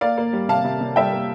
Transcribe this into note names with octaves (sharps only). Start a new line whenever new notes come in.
A#3 D5 F5
A#3
G3
C3 F5 A5
C3
C3
G3 E5 G5
A#3